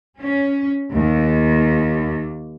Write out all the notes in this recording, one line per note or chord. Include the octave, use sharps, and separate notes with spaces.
C#4
D#2